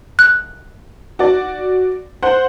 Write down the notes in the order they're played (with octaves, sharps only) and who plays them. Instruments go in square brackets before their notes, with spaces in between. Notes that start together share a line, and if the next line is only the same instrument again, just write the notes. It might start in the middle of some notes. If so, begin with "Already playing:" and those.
[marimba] F#6
[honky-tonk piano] F#4 D5
C5 F#5